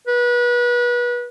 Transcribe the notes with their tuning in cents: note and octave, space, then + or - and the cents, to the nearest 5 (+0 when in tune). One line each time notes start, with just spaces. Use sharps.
B4 -30